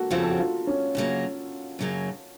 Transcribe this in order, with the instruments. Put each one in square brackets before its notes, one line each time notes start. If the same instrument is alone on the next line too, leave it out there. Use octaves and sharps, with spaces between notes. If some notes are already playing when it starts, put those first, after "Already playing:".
Already playing: [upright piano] A#3 F#4 A4
[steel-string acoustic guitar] F2 C#3 F3 C4 [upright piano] F4
[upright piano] A4
F#4
F4
C#4
[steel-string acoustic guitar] F#2 C#3 F#3 A#3
F#2 C#3 F#3 A#3